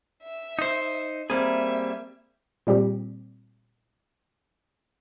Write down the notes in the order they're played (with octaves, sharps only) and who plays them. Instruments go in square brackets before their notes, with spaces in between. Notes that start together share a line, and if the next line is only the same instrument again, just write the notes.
[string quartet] E5
[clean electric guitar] D#4 C5
[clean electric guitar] G3 A#3 G#4 [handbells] C4 C5 B5 [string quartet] E5
[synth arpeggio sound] A#2 G3 C4 G4